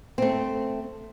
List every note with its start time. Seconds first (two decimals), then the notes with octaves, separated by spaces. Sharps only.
0.18 A3 C4